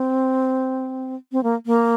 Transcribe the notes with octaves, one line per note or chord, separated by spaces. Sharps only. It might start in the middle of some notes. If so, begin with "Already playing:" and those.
Already playing: C4
C4
A#3
A#3